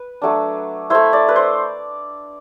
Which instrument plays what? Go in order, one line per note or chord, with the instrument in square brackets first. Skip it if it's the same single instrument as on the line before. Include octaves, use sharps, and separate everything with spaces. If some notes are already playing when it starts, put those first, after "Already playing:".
Already playing: [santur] B4
F#3 A3 D4
A3 E4 C5
D5
B4
C5